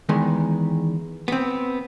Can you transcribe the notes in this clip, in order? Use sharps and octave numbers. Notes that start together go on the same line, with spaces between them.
E2 D#3 G#3 B3
B3 C4